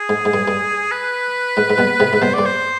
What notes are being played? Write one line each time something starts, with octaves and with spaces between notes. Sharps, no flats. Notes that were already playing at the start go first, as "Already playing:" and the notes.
Already playing: G#4
G#2
G#2
G2
G2
B4
G#2
G#2
G2 B2
G#2 C3
G#2
G2 B2 C5
G2 D5
C5